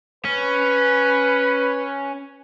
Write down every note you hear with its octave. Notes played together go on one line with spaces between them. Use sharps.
C#4 B4